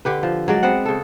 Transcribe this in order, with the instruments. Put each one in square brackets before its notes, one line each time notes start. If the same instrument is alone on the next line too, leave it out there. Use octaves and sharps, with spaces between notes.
[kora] D3 G4 B4
F3
F#3 G#3 D5
B3 C4 F#5
C#3 A4